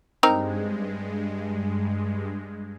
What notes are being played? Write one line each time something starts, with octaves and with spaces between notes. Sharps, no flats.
G2 G#3 C4 D#4 A#4